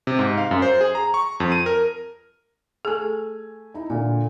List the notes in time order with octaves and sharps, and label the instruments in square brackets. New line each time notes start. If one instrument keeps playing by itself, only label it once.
[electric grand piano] C3
G#2
F5
F#2
C5
G#4
A#5
C#6
F2
D#7
A#4
[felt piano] A3 G#5 E6 [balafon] G#4 A4
[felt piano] D#4 E4
A#2 D3